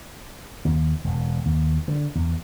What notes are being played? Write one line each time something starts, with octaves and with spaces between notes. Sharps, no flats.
D#2
E1
D#2
D3
E2